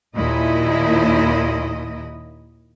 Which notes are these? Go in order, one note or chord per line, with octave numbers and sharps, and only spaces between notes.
D#2 A#2 E4 D#5